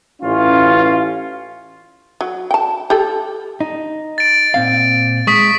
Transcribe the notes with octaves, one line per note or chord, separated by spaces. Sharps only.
A1 C#4 F4
F#3
G5 A5
G4 A4
D#4
A6 D7
A#2 C4 F5
G#3 C#6 D#6 B6